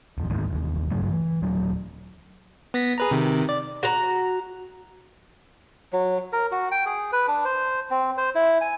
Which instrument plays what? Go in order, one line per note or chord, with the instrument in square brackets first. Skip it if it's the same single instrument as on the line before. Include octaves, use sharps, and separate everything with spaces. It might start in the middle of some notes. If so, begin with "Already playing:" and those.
[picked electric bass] D#1 F2
D#1 D2 G#2 D#3
F1 D#2
G2 C#3 F#3 A3
E3
D#1 F#3
[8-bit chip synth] B3 A#6 B6
G#4 B4 A#5
C3 D#3
D5
[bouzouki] F#4 A#5
[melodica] F#3
A#4
F#4
G5
G#4
B4
D4
C5
C4
C5
E4
G#5